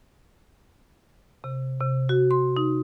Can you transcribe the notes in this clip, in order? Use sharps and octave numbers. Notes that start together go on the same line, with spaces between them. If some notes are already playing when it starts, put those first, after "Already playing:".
C3
C3
F#4
C6
D#4